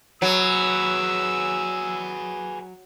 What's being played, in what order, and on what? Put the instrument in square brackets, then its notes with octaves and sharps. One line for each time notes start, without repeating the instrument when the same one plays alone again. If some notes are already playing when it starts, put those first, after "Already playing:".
[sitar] F#3 [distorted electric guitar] G#4 B4 [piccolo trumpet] E6